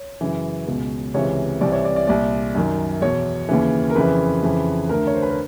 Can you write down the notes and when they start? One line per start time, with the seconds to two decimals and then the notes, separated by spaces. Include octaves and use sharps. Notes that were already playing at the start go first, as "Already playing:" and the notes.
Already playing: C#5
0.21 F#2 C#3 E3
0.67 C#2 B2
1.14 C#2 C3 E3 C#5
1.61 C2 C3 E3 D5
1.72 C#5
1.85 D5
1.96 D5
2.08 C2 A#2 D5
2.55 F#2 D#3
3.01 E2 B2 C#5
3.49 D#2 C#3 E3
3.90 A#4
3.96 F2 C#3 E3 B4
4.42 F2 C#3 E3
4.89 D2 D3 A#4
5.07 C#5
5.14 C5
5.22 B4
5.29 A#4